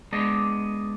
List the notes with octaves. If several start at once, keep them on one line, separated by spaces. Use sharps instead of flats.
G#3 B3 D4 D5 D#5